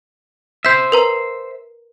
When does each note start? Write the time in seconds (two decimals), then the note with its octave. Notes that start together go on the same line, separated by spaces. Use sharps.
0.65 C5 E5 G6 B6
0.92 A#4 B4 A#5